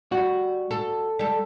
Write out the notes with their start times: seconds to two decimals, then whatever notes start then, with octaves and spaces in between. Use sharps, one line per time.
0.12 G3 F#4
0.71 A4
1.19 G3 A4